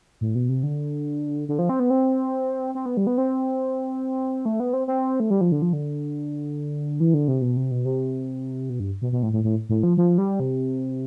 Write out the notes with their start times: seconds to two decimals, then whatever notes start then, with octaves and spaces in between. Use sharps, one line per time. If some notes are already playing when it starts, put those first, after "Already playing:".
0.21 A2
0.35 B2
0.49 C3
0.63 D3
1.49 D3
1.59 F3
1.69 C4
1.80 B3
1.90 C4
2.75 C4
2.86 B3
2.97 G3
3.07 B3
3.18 C4
4.45 A3
4.60 B3
4.73 C4
4.88 C4
5.20 A3
5.30 G3
5.41 F3
5.52 D3
5.62 F3
5.73 D3
7.00 E3
7.14 D3
7.28 C3
7.42 B2
7.57 C3
7.71 B2
7.85 C3
8.70 B2
8.80 G2
9.02 B2
9.12 B2
9.23 A2
9.33 A2
9.44 A2
9.69 A2
9.83 F3
9.97 F3
10.18 G3
10.40 C3